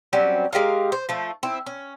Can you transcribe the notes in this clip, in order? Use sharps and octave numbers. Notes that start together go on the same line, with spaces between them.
F#3 G3 C4 C#4
G#3 G4 A#4 F5
C5
F3 A3
C4 E4
C#4